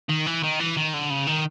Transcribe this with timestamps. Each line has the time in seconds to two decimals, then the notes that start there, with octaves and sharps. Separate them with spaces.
0.09 D#3
0.26 E3
0.43 D#3
0.59 E3
0.76 D#3
0.94 D3
1.10 C#3
1.27 D#3